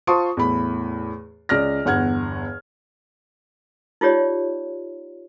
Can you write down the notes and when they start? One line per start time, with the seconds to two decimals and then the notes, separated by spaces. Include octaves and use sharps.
0.07 F4 C5 A5 C6 C#6 D#6
0.37 E2 A2 B5
1.49 C#2 D5 F6 A#6
1.85 G1 E2 F#5 F6 G#6
4.01 D#4 F4 G4 C#5 D5